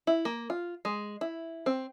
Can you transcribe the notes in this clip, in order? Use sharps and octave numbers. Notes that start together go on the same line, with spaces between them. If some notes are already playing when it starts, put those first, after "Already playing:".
E4
A#3
F4
G#3
E4
C4